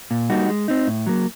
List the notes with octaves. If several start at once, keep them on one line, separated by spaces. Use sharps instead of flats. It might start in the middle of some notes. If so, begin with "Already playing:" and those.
A#2
G3 A#3 D#4 F#4
G#3
C4 D#4
A2
F#3 A#3